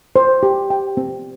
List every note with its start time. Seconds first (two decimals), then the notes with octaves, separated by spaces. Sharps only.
0.16 C5
0.43 G4
0.70 G5
0.97 C4